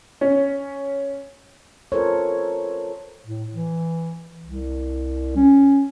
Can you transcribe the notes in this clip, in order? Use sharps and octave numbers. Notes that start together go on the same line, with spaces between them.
C#4
F4 A4 A#4 C5 C#5
A2
E3
C2
C#4